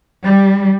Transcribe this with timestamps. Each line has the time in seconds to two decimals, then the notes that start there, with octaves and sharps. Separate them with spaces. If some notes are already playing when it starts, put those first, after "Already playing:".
0.23 G3